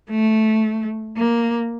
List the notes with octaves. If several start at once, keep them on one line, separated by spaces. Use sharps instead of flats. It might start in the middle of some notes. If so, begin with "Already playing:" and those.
A3
A#3